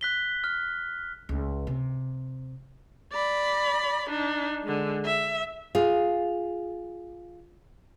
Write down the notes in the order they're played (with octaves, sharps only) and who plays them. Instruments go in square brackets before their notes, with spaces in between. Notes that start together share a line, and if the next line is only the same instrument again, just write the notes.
[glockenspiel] F#6 B6 G7
F6
[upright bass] C#2
C3
[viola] D5 B5
D4 D#4
D3 G#3
E5
[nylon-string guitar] F4 G#4